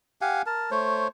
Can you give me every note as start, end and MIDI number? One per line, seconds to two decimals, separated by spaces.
0.21 0.42 67
0.21 0.42 77
0.21 0.42 78
0.21 0.42 80
0.46 0.70 70
0.46 0.70 81
0.71 1.08 57
0.71 1.08 72
0.71 1.08 73